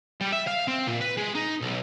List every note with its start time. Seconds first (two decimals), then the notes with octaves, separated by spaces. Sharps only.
0.21 G3
0.32 E5
0.47 F5
0.68 C4
0.87 A#2
1.01 B4
1.17 G#3
1.35 D#4
1.61 B1